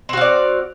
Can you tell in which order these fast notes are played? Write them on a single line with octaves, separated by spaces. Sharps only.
C4 F#4 F5 D5